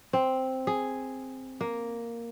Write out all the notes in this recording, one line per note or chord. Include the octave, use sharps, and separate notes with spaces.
C4
G#4
A#3